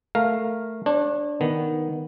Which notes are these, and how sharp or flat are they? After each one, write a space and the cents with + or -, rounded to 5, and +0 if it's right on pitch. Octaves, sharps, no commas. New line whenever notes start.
A3 +0 A#4 +0 F5 +0
D4 +0 C#5 -40
D#3 +0 B3 -5